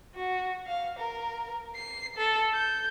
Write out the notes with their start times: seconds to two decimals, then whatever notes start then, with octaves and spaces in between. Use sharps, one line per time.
0.15 F#4
0.67 F5
0.99 A#4
1.76 C7
2.17 A4
2.53 G6